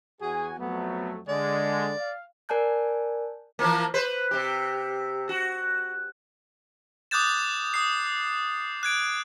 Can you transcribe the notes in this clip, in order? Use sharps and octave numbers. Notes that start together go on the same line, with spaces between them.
E2 F#4 G#4 G#5
F2 F#3 A3 B3
D3 G#3 D5
F5
A#4 D5 G#5 A5 F#6 G6
E3 F3 A#3
B4 C5
C3 G4
F#4
D6 D#6 F#6 G6 A6 E7
D#6 C7
F#6 G#6 D7